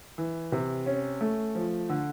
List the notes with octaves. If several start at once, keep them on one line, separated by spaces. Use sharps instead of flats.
E3
C3
C#4
A3
F3
D3